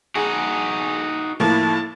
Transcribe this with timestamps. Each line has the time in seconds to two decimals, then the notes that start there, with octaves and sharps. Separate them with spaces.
0.15 D#4 F#4 G#4
1.40 A2 F3 A#3 E4 A5